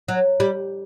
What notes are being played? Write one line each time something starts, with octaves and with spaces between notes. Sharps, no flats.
F#3
G3